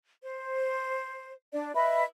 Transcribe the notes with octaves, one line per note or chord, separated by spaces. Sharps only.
C5
D4 D5
B4 D#5 E5 B5